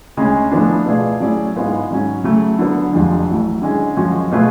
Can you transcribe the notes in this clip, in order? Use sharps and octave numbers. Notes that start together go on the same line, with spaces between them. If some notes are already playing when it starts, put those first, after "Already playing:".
D2 C#3 G#3 C#4 G#4
A2 F3 B3 D4
B2 A3 F4 G#4 D5
A2 F#3 C#4 G#4 D5
G#2 G#3 B3 F4
G#2 F#3 C#4
C#3 F#3 A3
D3 F#3 B3
F1 F2 F3 G#3 D4
A1 A2 F#3
D3 G#3 C#4 G#4
F#2 F3 G#3 C#4 F#4
B2 A3 F4 G#4 B4